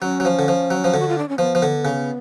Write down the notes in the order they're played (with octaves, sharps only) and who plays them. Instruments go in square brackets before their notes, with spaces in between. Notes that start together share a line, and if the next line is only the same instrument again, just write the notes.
[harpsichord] F#3 [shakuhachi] C#4
[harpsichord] F#3
F3
D3
F3
F#3
F3
D3
[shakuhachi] F#4
F4
D4
C#4
[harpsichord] F3 [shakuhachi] B3
[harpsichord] F3
D3
C#3